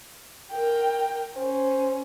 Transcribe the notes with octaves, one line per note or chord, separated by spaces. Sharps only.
A#4 G5
C#4 C5